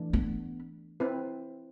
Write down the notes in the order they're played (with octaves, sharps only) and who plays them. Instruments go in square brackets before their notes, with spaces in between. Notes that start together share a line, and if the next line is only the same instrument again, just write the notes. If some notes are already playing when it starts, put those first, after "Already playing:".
Already playing: [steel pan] E3 A3 D4
[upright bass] B3
[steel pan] C4 E4 B4